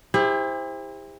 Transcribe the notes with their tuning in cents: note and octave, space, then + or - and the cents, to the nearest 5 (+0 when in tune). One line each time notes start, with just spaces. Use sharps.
E4 -15 G4 +40 C5 +0